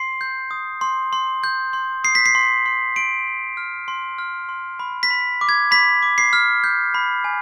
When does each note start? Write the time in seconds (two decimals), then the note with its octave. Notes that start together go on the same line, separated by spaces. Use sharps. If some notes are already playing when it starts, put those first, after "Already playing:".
Already playing: C6 C7
0.21 G6
0.51 D#6
0.81 C6
1.13 C6
1.44 G6
1.73 C6
2.04 D#6 C7
2.15 B6
2.26 C7
2.35 C6
2.66 C6
2.96 C6 D7
3.27 C6
3.57 F6
3.88 C6
4.18 F6
4.49 C6
4.80 B5
5.03 B6
5.11 B5
5.41 D6
5.49 G#6
5.71 B5 B6
6.03 D6
6.18 C7
6.33 F6
6.64 G6
6.94 B5
7.24 G#5